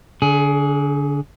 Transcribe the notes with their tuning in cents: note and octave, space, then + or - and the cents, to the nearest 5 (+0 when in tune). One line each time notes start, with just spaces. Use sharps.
D3 -25 G#4 +20